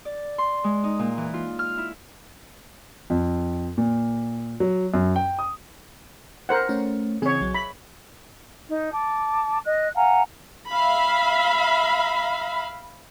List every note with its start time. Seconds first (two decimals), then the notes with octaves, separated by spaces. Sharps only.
0.05 D5
0.38 C6
0.64 G#3
0.84 D#4
0.99 A#2
1.17 E3
1.34 F4
1.59 F6
1.78 E4
3.10 F2
3.78 A#2
4.60 F#3
4.94 F#2
5.16 G5
5.39 D#6
6.49 A#4 C5 F#5
6.69 A3 C#4 C#5
7.22 C#3 E3 C4 G#4 C#5
7.41 B1 F#3
7.54 B5 A#6 B6
8.68 D#4
8.91 A5 D6
9.65 D#5 F#6
9.96 F5 F#5 G#5 A#5
10.70 E5 F5 B5